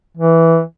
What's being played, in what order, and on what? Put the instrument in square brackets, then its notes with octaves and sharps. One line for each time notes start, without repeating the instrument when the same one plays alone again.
[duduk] E3